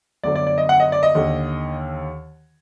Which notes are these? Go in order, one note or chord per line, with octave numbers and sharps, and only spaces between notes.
G1 F#2 D3 D5
D5
D5
D#5
F#5
D#5
D5
D#5
D#2 D3